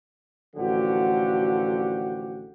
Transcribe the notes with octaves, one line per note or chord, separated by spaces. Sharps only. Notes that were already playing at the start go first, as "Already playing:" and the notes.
A1 D3 F3 F#4 G4 F#5